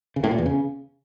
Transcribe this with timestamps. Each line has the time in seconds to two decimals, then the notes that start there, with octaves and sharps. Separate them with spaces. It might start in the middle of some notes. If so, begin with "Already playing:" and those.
0.16 C#3
0.24 A2
0.31 A#2
0.38 E2
0.46 C#3